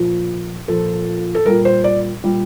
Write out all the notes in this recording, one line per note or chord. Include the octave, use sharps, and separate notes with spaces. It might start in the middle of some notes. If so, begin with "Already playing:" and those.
Already playing: A#2 F3
A#2 F3 A4
A4
A#2 G3 A#4
C5
D5
A#2 G3